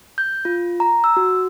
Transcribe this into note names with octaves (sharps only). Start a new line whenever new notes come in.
G6
F4
A#5
E6
F#4